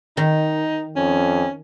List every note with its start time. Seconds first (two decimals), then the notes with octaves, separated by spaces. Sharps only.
0.17 D#3 D#4
0.97 F2 C#4